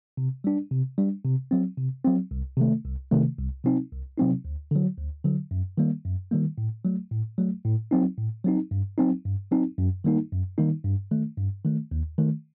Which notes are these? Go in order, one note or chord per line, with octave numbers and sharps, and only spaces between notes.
C3
G3 D4
C3
G3 D4
C3
F#3 C4
C3
F#3 C4
C2
C3 D#3 A3
C2
C3 D#3 A3
C2
C3 F#3 C4 D#4
C2
C3 F#3 C4 D#4
D2
D3 F#3
D2
D3 F#3
F#2
D#3 G3 A#3
F#2
D#3 G3 A#3
A2
F#3 A3
A2
F#3 A3
A2
F#3 C4 D#4
A2
F#3 C4 D#4
G2
F#3 C4 D#4
G2
F#3 C4 D#4
F#2
D#3 G3 A#3 D#4
F#2
D#3 G3 A#3 D#4
G2
D#3 A3
G2
D#3 A3
D#2
D#3 A3